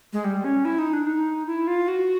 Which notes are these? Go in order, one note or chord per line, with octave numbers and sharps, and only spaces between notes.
G#3
G3
C#4
E4
D#4
D4
D#4
E4
F4
F#4